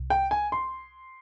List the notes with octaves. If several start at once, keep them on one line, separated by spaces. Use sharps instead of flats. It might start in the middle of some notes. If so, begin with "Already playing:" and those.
Already playing: C2 C3
G5
G#5
C6